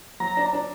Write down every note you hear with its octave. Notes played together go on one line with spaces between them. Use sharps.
F#3 A#5
D4
D4